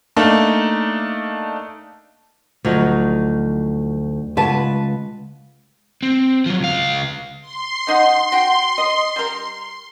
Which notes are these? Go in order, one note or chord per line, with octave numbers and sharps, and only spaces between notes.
A3 A#3 D4 D#4
D2 F3 F#3 D#4
C#2 B4 F#5 A5
C4
F3 F#3
C#2 F5
C6
D#3 D#4 F#5
F#4 G5
D#5
G3 A#4